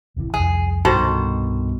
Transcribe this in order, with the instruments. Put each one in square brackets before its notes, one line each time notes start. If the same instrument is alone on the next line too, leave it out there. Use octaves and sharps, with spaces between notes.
[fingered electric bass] D1 C3 E3
[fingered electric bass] C2 F2 [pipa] G#4
[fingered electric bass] C2 G2 B3 [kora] B2 [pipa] D#3 A4 C5